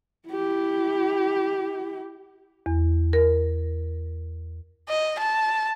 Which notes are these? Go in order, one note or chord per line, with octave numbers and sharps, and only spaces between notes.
E4 G4
E2
A#4
D#5
A5